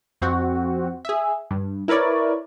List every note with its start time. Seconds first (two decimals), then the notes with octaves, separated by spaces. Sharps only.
0.22 F2 C4 F#4
1.05 G#4 E5
1.51 G2
1.88 E4 A#4 B4 C#5 D5